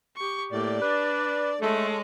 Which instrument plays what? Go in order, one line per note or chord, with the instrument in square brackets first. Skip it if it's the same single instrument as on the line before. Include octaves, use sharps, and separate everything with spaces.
[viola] G4 C#6
[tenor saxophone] A2 [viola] A#3 G4 [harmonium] D5
[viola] D4 [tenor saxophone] B4
[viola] G#3 C#5 [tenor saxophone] A3 [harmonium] A4